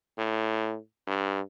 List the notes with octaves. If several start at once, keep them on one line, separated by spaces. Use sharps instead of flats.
A2
G2